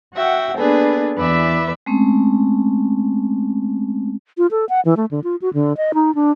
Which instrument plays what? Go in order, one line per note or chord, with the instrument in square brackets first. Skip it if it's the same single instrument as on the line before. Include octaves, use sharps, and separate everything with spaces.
[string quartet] F#4 E5 F#5 G5
A#3 B3 D4 G#4 A4 B4
E2 E3 B4 D5 E5 E6
[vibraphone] G#3 A3 C4 C#4
[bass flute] F4
A4
F#5
E3
A3
D3
F4
F#4
D3
D#5
D#4
D4